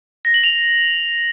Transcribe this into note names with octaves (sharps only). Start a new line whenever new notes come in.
A#6
F#7
F7